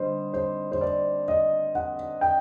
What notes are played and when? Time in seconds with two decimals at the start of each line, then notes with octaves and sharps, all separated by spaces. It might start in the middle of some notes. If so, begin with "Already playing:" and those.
Already playing: D3 G3 C5 D#5
0.34 C5
0.72 C5
0.81 D5
1.28 D#5
1.75 F#5
2.21 G5